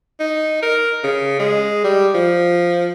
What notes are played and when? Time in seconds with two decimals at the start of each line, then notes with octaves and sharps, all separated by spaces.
0.20 D#4
0.62 A#4
1.04 C#3
1.40 G#3
1.84 G3
2.15 F3